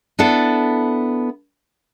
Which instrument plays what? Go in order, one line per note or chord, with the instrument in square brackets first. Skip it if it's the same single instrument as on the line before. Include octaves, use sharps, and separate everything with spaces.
[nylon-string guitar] B3 D4 E4 A4